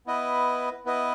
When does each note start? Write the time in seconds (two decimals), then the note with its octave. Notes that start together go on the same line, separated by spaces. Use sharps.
0.07 B3 E4 B4 D#5
0.86 B3 E4 B4 D#5